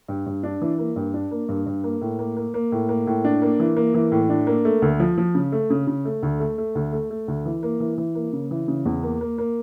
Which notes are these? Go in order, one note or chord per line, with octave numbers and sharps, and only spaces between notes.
G2
G2
D4
E3
A#3
G2
D4
A#3
G2
G2
A#3
A2
A#3
A#3
A#3
A2
A#3
A2
D4
A#3
E3
A#3
E3
A2
D4
A#3
A3
D2
F3
F3
C#3
A3
C#3
C#3
A3
D2
A3
A3
D2
A3
A3
D2
E3
A#3
E3
E3
A#3
C#3
E3
C#3
E2
A#3
A#3
A#3